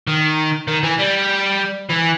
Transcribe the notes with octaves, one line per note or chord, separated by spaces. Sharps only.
D#3
D#3
E3
G3
E3